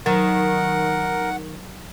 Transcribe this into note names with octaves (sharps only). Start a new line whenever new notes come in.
D#3 F#3 A#4 F#5